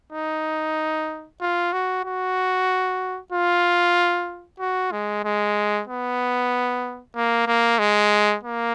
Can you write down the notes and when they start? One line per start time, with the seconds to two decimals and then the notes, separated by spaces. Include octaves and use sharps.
0.13 D#4
1.41 F4
1.73 F#4
2.04 F#4
3.32 F4
4.60 F#4
4.92 G#3
5.25 G#3
5.87 B3
7.15 A#3
7.47 A#3
7.79 G#3
8.44 A#3